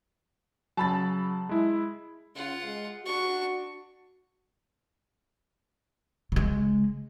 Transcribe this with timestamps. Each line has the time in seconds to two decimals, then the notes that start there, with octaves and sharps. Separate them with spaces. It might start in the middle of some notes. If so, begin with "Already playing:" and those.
0.77 C#3 F#3 A5 B5 A6
1.49 G#3 E4
2.35 C#3 F4 F#5
2.65 G#3
3.05 D4 F#4 C#6
6.32 C#3 G#3